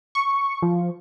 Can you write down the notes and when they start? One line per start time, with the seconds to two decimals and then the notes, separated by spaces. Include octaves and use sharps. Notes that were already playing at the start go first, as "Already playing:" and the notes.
0.15 C#6
0.62 F3